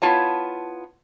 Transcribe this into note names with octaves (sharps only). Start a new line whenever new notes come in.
B3 E4 F4 C#5 A5